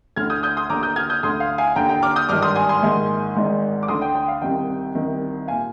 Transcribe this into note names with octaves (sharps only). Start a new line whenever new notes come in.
D2 D3 F6 G#6
D#6 G6
D#6 G6
C6 D#6
D#2 D3 A#5 D6
D#6 G6
F6 G#6
D#6 G6
D2 D3 C6 D#6
F5
F5 G#5
D#2 D3 G5 A#5
G5 A#5
D6 F6
D#6 G6
G#1 G2 D#3 D6 F6
C6 D#6
G#5 C6
G#5 C6
A#1 G#2 D#3
G#1 G#2 D#3
D6
D2 D3 C6 D#6
G5
G5
F5
C2 C3 D#3 G5
C2 C3 D#3
A#2 F5 G#5